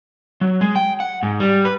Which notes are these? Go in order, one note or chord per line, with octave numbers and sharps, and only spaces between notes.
F#3
G#3
G5
F#5
G#2
G3
B4